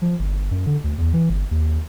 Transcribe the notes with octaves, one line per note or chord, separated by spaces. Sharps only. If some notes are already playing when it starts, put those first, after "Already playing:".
F3
G1
F#2
D3
D2
E2
E3
G1
D#2